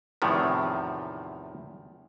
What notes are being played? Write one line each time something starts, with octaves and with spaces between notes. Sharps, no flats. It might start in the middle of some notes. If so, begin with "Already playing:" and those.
E2 A2 C3 D#3 F3